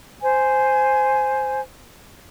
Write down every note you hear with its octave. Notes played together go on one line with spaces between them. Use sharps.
C5 G#5